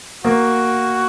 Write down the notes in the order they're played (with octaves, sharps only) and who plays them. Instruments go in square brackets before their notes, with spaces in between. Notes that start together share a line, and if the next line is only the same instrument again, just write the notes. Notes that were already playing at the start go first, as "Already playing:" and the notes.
[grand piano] A#3 [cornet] F#4